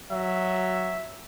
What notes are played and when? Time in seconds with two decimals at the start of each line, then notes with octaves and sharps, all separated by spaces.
0.11 F#3 E5